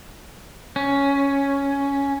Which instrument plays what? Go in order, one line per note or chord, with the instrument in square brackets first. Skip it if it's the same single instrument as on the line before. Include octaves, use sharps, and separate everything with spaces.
[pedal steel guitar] C#4